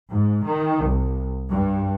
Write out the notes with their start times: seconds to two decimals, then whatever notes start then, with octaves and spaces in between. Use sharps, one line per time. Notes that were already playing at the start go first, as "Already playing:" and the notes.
0.10 G#2
0.44 D#3
0.83 C2
1.49 G2